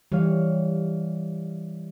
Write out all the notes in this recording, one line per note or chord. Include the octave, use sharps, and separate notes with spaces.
E3 G3 C#5 F5